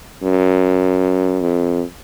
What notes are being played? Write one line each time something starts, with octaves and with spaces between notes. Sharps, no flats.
F#2
F2